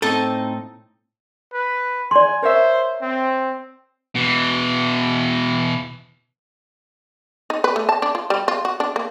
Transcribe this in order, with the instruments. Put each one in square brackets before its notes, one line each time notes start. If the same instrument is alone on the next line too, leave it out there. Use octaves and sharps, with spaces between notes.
[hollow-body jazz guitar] A2 A4 [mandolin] C4 D#4 A5
[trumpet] B4
[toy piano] D5 C6 [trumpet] G#5
[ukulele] A#4 C#5 E5 [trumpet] C5
[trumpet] C4
[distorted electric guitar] B2 E3
[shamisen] D#4
B4
A3
A5
D4
F4
G3
F4
F#4
D4
A#3